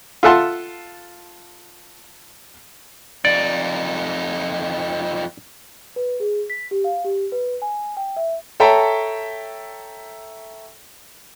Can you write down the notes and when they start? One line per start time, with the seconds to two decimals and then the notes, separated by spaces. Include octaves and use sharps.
0.23 F4 A4 E5 F#5 A5 C6
3.25 F2 D#4 D5
5.96 B4
6.20 G#4
6.50 B6
6.71 G4
6.84 F5
7.04 G4
7.32 B4
7.62 G#5
7.97 G5
8.17 E5
8.60 A4 C#5 E5 G5 A5 A#5